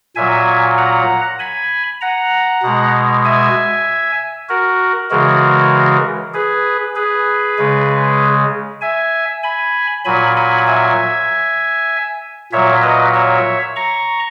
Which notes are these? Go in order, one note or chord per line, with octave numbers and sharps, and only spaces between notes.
A#2 F#3 E5 G#5
F#5 A#5
G#5 B5
F#5 A#5
B2 G#3
E5 G#5
F#4 A#4
C#3 E3 G#3 F#4 A#4
G#4 B4
G#4 B4
C#3 G#3
E5 G#5
G#5 B5
A#2 F#3 G#5 B5
G#5 B5
E5 G#5
A#2 F#3 C#5 E5
B4 D#5
C#5 E5
A#5 C#6